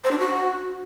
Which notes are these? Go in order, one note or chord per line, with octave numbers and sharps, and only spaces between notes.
C5
D4
F#4